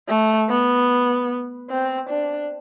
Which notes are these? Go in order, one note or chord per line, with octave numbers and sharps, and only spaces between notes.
A3
B3
C4
D4